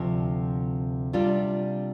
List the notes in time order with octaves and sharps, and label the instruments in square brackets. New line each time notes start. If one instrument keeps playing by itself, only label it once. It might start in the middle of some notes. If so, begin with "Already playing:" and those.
Already playing: [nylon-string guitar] D2 C3 F3
C3 G3 D4 F4